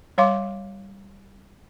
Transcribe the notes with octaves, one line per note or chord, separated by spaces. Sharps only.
G3 C#5 F5 C6 D6